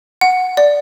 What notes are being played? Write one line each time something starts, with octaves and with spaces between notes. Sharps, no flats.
F#5
D5